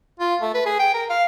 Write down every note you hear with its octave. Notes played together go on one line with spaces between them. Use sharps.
F4
A3
B4
G#4
G5
A#4
F5